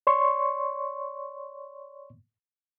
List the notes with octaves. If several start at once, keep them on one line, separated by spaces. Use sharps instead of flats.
C#5 D5 C6 C#6